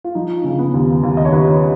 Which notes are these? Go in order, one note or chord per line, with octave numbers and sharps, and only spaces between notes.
F4
F3 D#4
C#3
B3
D#2
D#2
D#5
C#5
D#2 B4